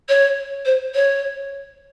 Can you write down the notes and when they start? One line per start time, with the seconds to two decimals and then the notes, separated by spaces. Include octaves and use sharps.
0.09 C#5
0.65 C5
0.95 C#5